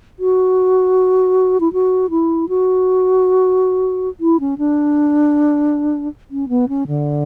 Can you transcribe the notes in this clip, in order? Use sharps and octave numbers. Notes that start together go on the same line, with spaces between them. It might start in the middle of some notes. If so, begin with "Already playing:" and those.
F#4
E4
F#4
E4
F#4
E4
C#4
D4
C#4
B3
C#4
D3